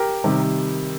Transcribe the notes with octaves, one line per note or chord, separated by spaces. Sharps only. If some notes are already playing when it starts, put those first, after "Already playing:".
Already playing: G4 A#4
C3 D#3 G3